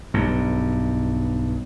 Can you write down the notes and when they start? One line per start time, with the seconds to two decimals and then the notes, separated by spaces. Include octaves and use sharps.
0.14 B1 G2